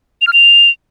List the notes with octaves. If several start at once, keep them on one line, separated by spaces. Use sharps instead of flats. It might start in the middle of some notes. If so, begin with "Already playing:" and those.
F7
F6
F7